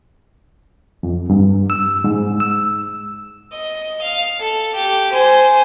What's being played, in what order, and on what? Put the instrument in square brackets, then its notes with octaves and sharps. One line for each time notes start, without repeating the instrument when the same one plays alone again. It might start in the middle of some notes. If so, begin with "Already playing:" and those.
[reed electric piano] F2
G2
E6
G#2
E6
[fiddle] D#5
F5
A4
G4
C5 G#5